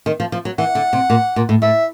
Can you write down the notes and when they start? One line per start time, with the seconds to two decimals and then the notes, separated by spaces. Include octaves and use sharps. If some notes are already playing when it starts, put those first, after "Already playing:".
0.06 D#3
0.20 F3
0.32 F3
0.45 F#3
0.58 E3 F#5
0.75 D3
0.93 C3
1.10 A#2
1.36 A#2
1.49 A2
1.62 A2 E5